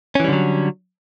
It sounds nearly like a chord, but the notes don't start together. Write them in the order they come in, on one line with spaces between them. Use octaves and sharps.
C#4 E3 G3 D3 F#3